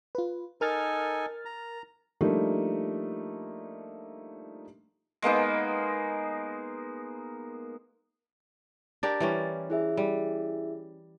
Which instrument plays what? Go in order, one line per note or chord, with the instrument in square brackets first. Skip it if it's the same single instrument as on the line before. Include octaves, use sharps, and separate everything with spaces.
[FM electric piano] F4 B4
[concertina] D#4 A4 G#5 [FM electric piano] A#4 F6 A6
[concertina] A#5
[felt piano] F3 G3 A3 A#3 D4 D#4
[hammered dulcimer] G#3 A#3 B3 D#4
[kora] D4 G4 A#4 [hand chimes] A6
[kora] E3 G3 C#4
[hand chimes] E4 G#4 E5
[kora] G3